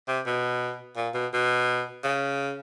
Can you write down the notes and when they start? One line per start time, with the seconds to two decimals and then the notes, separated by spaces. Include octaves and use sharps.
0.08 C3
0.26 B2
0.96 A#2
1.14 B2
1.33 B2
2.04 C#3